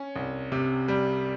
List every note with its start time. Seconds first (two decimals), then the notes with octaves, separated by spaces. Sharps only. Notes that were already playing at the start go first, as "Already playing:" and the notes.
Already playing: C#4
0.16 C2
0.52 C3
0.88 G3